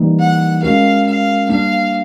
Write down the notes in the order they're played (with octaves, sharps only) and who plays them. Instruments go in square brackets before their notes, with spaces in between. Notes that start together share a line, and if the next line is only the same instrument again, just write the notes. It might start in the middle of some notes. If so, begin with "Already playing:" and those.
Already playing: [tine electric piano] E3 G3 A#3 D#4
[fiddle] F#5
[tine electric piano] G#3 C#4 F#4 A#4 [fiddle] F5
[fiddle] F5
[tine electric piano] G3 A#3 D4 [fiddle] F5